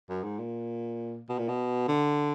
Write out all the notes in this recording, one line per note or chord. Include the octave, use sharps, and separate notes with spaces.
F#2
G#2
A#2
B2
A#2
B2
D3